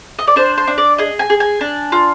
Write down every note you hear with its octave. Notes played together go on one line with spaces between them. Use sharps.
D#5
D5
D4 C5
C5
D4
D5
G#4 D#5
G#5
G#4
G#5
D4
F4